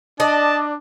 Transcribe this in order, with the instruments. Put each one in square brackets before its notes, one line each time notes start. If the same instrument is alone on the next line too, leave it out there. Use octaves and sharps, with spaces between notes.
[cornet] D4 [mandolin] D5 [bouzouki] D#5 [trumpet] A5